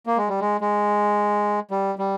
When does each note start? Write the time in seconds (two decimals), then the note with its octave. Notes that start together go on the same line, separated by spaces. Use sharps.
0.06 A#3
0.17 G#3
0.29 G3
0.40 G#3
0.61 G#3
1.71 G3
1.99 G3